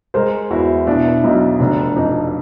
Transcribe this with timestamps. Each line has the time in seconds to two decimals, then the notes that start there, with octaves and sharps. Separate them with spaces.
0.14 G#3 A#4 C5
0.50 E2 E4 F#4
0.87 B2 D4 E4
1.23 B1 D#4
1.59 F1 D4
1.96 F2 D#4